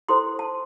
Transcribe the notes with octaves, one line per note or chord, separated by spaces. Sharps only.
E4 A4 C5 C6
A5